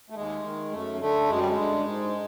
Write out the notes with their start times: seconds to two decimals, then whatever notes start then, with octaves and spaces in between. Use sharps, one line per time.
0.10 A3
0.15 D#2 G#3
0.44 D#3
0.72 F#2 A3
1.00 D3 A3
1.28 F#2 G#3
1.38 G3
1.49 G#3
1.56 D3
1.85 G#2